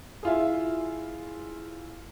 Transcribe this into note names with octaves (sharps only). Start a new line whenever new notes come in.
E4 F4 G#4